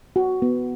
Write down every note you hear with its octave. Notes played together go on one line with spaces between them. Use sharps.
F#4
B3